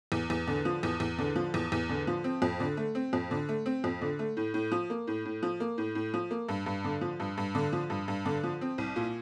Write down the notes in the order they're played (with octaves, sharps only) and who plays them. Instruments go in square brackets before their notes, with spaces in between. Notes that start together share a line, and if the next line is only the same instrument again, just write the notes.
[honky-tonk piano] E2
E2
D3
F3
E2
E2
D3
F3
E2
E2
D3
F3
C4
F2
D3
A3
C4
F2
D3
A3
C4
F2
D3
A3
A2
A2
F3
A#3
A2
A2
F3
A#3
A2
A2
F3
A#3
G2
G2
D3
F3
G2
G2
D3
F3
G2
G2
D3
F3
C4
C2
A#2